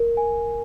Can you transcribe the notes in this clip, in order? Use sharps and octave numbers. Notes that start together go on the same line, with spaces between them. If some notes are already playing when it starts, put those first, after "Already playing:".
Already playing: A#4
G#5